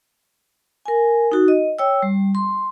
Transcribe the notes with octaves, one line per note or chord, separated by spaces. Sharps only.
A#4 G#5
D#4 F#4
D#5
C#5 G5 E6
G3
C6